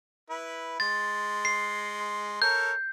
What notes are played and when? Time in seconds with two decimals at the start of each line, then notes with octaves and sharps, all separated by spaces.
0.30 E4 B4
0.80 G#3 C6 A6
1.45 C7
2.42 A4 A#4 C#5 G6